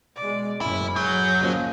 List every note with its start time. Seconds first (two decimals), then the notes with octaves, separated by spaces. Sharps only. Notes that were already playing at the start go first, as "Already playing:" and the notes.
0.16 B2 G#3 D5
0.61 F#1 A2 C#4 E4
0.96 F#3 G#4 G6
1.38 C#3 F3 A#3 G#4 D#5